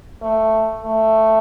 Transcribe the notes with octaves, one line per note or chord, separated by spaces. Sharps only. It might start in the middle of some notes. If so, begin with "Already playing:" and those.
A3
A3